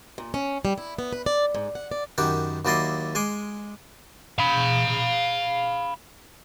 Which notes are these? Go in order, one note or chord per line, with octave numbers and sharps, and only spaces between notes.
A#2
C#4
G3
E4
B3
B4
D5
G#2
F#5
D5
F#2 D#3 G4 F#5 B5
D#2 F#3 E4 D5 D#5 C6
G#3 G#5 C6 D6
F5 B5